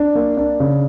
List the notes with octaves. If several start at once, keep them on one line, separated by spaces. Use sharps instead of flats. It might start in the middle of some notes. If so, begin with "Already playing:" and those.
Already playing: D4
A#3
D4
C#3